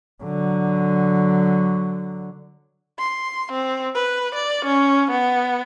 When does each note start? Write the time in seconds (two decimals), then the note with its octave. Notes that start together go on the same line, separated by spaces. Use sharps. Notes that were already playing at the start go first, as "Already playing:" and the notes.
0.23 D3 F#3
2.98 C6
3.52 C4
3.95 B4
4.35 D5
4.65 C#4
5.11 B3